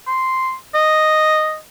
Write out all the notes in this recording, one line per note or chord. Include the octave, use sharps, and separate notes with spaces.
C6
D#5